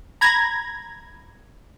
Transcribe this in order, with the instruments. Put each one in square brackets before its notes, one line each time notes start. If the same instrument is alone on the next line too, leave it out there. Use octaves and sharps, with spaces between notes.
[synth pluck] A#5 B5 G#6 A#6